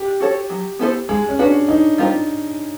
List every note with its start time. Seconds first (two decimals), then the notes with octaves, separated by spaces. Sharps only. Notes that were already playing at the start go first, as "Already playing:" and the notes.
Already playing: G4
0.20 F#4 A4 C#5
0.50 F#3
0.79 B3 E4 A4 C5
1.09 G#3 G#4
1.29 C#4
1.39 C#4 D4 F#4 B4
1.68 E3 D#4
1.98 G3 C4 F4 A#4